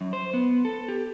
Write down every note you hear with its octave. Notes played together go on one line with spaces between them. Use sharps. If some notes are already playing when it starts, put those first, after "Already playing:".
F#2
C5
B3
A4
G4